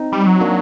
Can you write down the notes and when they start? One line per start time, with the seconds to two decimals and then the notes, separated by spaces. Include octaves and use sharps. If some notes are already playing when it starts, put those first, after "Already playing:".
Already playing: C4 D#4
0.12 G3
0.27 F#3
0.41 A#3 D4